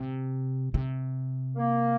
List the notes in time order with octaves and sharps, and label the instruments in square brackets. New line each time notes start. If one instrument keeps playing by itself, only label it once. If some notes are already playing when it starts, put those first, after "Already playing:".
Already playing: [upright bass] C3
C3
[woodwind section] A#3